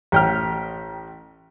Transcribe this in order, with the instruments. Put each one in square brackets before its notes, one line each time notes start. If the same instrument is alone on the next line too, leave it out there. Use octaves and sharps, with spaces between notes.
[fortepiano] A1 G5 F6